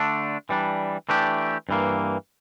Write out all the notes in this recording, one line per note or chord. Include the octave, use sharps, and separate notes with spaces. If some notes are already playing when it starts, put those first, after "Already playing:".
Already playing: D3 A3 D4
E3 G3 D4
E3 A3 D4 G4
G2 E3 A#3